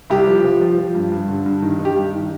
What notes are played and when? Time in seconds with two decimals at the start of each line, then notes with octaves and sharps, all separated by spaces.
0.10 C2 G4
0.27 F3
0.44 F3
0.62 F3
0.78 F3
0.95 G2
1.12 G2
1.29 D3
1.46 G2
1.62 D#3
1.79 D#3
1.85 G4
1.96 G2
2.14 D#3